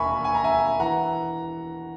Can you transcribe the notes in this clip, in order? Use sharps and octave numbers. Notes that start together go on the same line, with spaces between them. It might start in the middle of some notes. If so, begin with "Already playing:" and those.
Already playing: E1 D#2 A#4 E5 G#5 B5 C#6
G#5
A#5
E5 G#5
E3 F#5 A#5